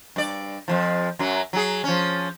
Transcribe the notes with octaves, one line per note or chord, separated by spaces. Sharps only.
G2 D5
F2 B2 F3
F#2 F#3
F#3 G#4
F3 C#4